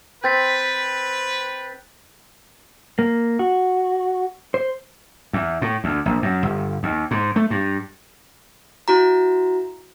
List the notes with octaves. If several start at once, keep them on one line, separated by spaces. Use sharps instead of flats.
C4 B4 G6 A6 B6
A#3
F#4
C5
E2
A2
D2
A#1
F#2
G1
D#2
G#2
A3
G2
E4 F#4 A#5